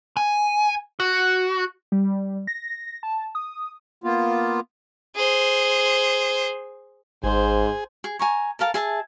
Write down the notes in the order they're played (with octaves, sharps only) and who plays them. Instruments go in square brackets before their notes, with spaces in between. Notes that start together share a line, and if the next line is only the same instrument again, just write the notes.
[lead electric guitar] G#5
F#4
[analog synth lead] G3
A#6
A5
D#6
[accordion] A#3 B3 F4
[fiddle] G#4 C5
[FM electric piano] G#1 [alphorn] G#2 [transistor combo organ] G#4 [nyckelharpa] C5
[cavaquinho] G#4
G#5 A#5 C#6
A4 A#4 F5 A5
G#4 E5 A5